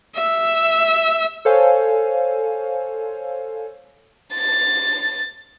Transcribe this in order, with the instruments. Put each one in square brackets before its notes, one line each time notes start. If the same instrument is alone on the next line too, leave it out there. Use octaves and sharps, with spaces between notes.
[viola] E5
[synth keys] A4 C5 C#5 F5 G#5
[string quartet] A6